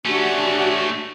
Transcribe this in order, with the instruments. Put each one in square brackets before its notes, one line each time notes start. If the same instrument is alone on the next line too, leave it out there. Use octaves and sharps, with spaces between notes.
[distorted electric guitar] A3 C#4 [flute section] D4 F#4 G4